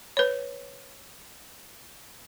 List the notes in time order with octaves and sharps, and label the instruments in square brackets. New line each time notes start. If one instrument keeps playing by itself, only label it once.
[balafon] B4 C#5